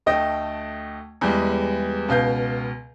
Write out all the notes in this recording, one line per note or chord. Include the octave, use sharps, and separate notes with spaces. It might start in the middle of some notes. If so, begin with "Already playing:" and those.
D2 A3 D#5 G5
E2 G3 G#3
C#2 B2 F5 G6